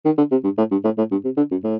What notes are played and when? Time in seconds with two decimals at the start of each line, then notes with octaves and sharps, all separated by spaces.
0.05 D#3
0.18 D3
0.31 C3
0.44 G2
0.58 A2
0.71 G2
0.85 A2
0.98 A2
1.11 G2
1.25 C3
1.37 D3
1.51 F#2
1.64 A2